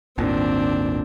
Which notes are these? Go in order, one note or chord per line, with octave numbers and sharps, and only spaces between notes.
G#1 D#2 A#2 C4 D4